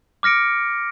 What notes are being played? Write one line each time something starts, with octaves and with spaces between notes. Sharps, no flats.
D6 F6 A#6 C#7 D7